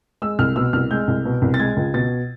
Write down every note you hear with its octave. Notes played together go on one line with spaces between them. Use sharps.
G#3 E6
C2 F6
B2 E6
C2 F6
G#3 G6
C2
B2
C2
A6
G#3 G#6
C#2
B2 A6